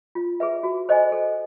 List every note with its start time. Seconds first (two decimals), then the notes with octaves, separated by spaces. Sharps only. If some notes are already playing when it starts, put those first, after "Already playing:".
0.15 F4
0.40 G#4 B4 E5
0.63 F#4
0.89 A4 C5 D#5 G#5
1.12 A4